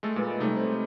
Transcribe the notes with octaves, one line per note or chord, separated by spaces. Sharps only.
G#3 A3 A4
A#2 G#3 B4
C3 G3 A3 D#4 C#5
C5